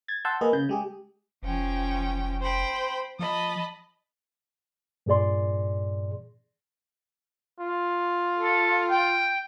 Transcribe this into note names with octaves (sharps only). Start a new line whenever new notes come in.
G#6 A6
F#5 A5 C6 E6 G6
A#3 G#4 B4 D#5
C#3 G6
G#3 G4 G#4
F1 F3 C#4 G5
C5 G5 B5
F3 D#5 A5 B5
G2 A#2 G#4 D5 C6
F4
A4
G5